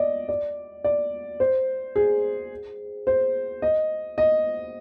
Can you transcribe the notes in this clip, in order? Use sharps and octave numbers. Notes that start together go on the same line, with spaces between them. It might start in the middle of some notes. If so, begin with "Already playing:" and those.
Already playing: D5 D#5
D5
D5
C5
G#4
C5
D#5
D#5